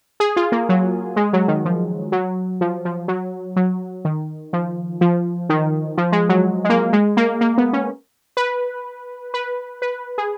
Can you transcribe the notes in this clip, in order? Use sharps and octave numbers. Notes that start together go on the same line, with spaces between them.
G#4
F4
A#3
F#3
G#3
F#3
D#3
F3
F#3
F3
F3
F#3
F#3
D#3
F3
F3
D#3
F3
G#3
F#3
G#3
A#3
G#3
A#3
A#3
B3
C#4
B4
B4
B4
G#4